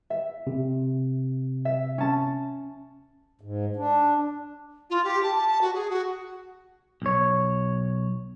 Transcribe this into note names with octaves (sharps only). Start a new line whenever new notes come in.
E5
C3
E5
C#4 A5
G#2
D4
F4
G4
A5
A5
A5
F#4
G#4
F#4
B1 C#5